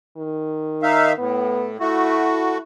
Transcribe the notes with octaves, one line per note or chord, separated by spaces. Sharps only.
D#3
D#4 E5 F5
A2 B3
A3 E4 F#4